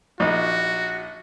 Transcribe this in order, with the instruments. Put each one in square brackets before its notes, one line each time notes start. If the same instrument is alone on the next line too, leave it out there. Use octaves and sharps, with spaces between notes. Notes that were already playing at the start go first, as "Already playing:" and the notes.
[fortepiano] A#1 D#4 [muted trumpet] F#4